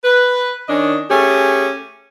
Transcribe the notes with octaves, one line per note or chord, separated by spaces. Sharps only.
B4
D#3 C#4 D4 D#5
A3 C#4 G4 G#4